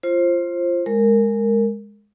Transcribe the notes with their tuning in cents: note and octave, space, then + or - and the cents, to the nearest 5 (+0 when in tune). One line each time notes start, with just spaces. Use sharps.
F4 -20 C5 +20
G#3 +0 A#4 -15